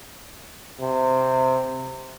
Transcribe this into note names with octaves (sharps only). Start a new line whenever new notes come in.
C3